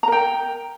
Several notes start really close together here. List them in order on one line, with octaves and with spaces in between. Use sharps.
A#5 A#4 G5